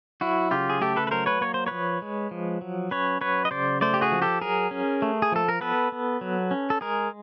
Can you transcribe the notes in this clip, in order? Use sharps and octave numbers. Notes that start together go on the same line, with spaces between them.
F#3 E4 F#4
C#3 F4 G4
G#4
A3 G4 A4
A4 B4
B4
F#3 A#4 C5
B4 C#5
A#3 C#5
C5
F3 B4 C#5
G#3
F3
F#3
C#4 B4 C#5
F#3 B4 C#5
D#5
C#3 C5 D5
A3 C5 D5
G4
F#4 G#4
F3
G4 A4
F#3 G#4 A#4
C#4
A3
G#4
F3 A4
A#4
B3 A4 B4
B3
F#3
C#4
A4
G#3 G#4 A#4